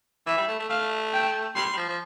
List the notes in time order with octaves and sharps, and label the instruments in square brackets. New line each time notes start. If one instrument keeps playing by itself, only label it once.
[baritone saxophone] E3 [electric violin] E5
[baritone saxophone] G3
A3
A3
[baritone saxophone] A3 [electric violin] F5
[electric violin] G5
[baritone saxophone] G3 [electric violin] C6
[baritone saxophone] G3
F3
F3